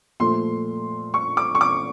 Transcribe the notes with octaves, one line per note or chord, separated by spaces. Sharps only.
A#2 F3 A3 C6
C#6
D6
C#6
D6